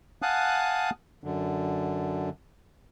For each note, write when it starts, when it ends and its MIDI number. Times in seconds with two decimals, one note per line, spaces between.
0.22 0.90 77
0.22 0.90 78
0.22 0.90 80
0.22 0.90 81
0.22 0.90 87
0.22 0.90 90
1.24 2.29 42
1.24 2.29 50